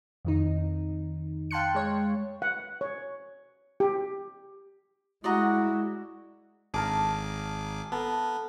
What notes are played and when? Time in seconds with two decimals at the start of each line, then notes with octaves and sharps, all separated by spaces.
0.25 F2 D#3 D#4
1.51 F5 G5 A5 C6 F#6 C#7
1.75 G#3 C#5
2.42 F#5
2.81 C#5
3.80 G4
5.24 G#3 E4 F#4 D5 D#5 A#5
6.74 G#1 D4 G#4 A#4 A5 D6
7.92 B3 A4 A#4